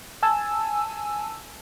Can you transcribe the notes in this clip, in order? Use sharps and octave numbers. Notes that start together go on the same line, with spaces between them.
G#5 A5 E6